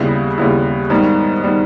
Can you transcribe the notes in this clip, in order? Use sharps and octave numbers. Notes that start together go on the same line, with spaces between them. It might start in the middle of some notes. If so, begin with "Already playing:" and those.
Already playing: D#2 C#3 G3 B3 E4
D#2 C#3 G3 B3 E4
G#2 D#3 G3 B3
D#3 G3 B3